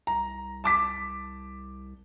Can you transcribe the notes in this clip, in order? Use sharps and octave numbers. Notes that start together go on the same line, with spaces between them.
C2 A#5
A5 D6 B6